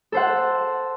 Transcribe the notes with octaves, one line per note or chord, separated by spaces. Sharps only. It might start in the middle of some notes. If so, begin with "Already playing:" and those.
A4 C5 F#5